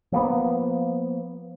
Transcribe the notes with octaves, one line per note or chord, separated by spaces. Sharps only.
F3 A#3 B3